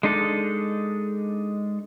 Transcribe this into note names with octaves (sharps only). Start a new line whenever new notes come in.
G#3 D4 D#4 A4